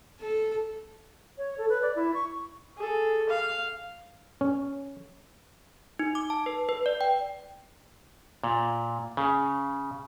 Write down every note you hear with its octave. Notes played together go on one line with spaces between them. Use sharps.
A4
C#5
A4
B4
D5
E4
C#6
G#4 A4
F5
C#4
D#4
D6
A5
B4
B4
D5
G5
A#2
C#3